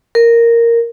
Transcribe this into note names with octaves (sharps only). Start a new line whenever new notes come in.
A#4